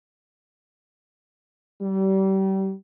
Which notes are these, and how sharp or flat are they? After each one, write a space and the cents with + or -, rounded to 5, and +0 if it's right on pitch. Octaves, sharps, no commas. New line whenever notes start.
G3 -30